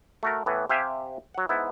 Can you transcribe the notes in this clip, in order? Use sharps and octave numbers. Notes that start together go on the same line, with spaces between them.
A3 F#4 A#4
A2 E3 B3
C3 G4 E5 F5 G5 G#5
F#3 F#5
G#2 B3 E4